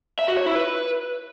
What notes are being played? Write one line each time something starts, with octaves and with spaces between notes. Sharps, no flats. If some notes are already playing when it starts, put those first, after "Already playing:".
E5
F#4
C#5
E4
B4